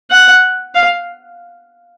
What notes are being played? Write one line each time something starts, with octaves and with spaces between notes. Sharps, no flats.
F#5
F5